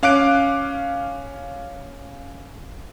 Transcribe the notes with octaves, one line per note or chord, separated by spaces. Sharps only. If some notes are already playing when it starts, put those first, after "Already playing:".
C#4 F5 D6 F#6 D7